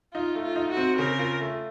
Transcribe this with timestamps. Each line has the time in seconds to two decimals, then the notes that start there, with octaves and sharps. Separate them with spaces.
0.13 D#4 F4
0.35 A3
0.43 F4
0.56 D#4
0.71 F#4
0.77 C4
0.98 C#3 A#4
1.19 F4
1.41 A3